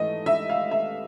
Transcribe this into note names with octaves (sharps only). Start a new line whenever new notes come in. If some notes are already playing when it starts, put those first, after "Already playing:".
Already playing: G#2 E3 A3 D#5
E5
F5
E5